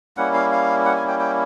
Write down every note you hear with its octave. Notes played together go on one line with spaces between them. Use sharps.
G3 A#3 C#4 E4 F#5
F5
F5
F#5
G#5
G5
G5